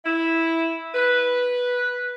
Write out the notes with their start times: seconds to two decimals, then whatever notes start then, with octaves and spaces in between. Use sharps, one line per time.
0.05 E4
0.94 B4